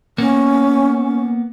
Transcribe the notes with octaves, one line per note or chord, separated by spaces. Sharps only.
A#3 B3 C#4